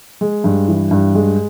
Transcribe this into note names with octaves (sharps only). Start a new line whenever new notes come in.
G#3
G2
E3
G2
G#3